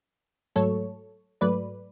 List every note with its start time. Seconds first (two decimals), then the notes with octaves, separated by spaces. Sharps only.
0.56 G#2 F#3 A3 A4 C#5
1.41 G#2 F#3 A3 B4 D5